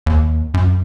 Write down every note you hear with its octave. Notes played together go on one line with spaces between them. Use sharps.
D#2
F#2